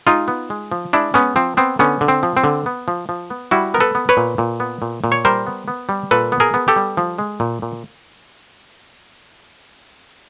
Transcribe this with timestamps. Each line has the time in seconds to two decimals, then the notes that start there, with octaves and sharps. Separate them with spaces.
0.07 G#3 D#4 F4
0.28 B3
0.50 G#3
0.72 F3
0.93 G#3 D4 E4
1.14 G#3 B3 C#4
1.36 F3 C4
1.57 B3 C4
1.79 D3 B3 C#4
2.01 D3
2.08 C4
2.23 F3
2.37 C4
2.44 D3
2.66 B3
2.88 F3
3.09 F3
3.30 B3
3.51 G3 E4 F#4
3.74 B3 A#4
3.80 A4 B4
3.95 B3
4.09 B4 C#5
4.17 A#2
4.38 A#2
4.60 B3
4.82 A#2
5.04 A#2
5.12 C#5
5.25 G3 A#4 C5
5.46 B3
5.68 B3
5.89 G3
6.11 A#2 A4 B4
6.32 B3
6.40 G#4 A#4
6.54 B3
6.68 G4 A4
6.76 G3
6.97 F3
7.18 G#3
7.40 A#2
7.62 A#2